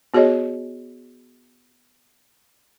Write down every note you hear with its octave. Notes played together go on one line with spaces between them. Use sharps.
B3 F#4 G#4 C#5 D#5